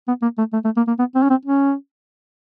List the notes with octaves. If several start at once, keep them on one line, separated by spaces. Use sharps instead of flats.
B3
A#3
A3
A3
A3
A#3
A#3
B3
C4
C#4
C4
C#4